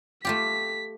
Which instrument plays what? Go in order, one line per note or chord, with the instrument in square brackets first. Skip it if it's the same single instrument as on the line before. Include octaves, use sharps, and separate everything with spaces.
[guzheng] A3 F4 G4 [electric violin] B6